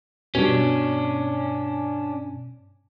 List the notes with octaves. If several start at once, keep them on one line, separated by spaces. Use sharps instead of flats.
G2 B2 C#4 D4